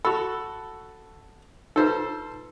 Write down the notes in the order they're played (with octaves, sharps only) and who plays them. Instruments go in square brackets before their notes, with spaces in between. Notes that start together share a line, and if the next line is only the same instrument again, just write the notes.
[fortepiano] F#4 A4 [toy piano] B5
[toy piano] D#4 F4 B4 [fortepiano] A4 C5